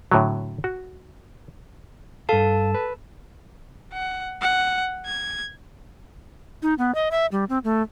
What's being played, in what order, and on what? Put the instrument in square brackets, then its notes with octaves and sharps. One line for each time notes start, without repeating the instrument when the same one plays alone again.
[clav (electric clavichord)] A2 D3 F#3
F#4
[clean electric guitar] G2 F5 [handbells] A4 A5
[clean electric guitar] B4
[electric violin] F#5
F#5
G#6
[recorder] D#4
B3
D#5
E5
G3
C4
A3